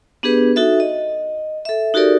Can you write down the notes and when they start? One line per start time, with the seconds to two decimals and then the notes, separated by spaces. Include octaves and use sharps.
0.23 B3 D4 G4 G#4 B4
0.56 D#4 F#4 A4 E5
0.80 D#5
1.65 A4 E5
1.94 D#4 F#4 G4 A4 A#4 D5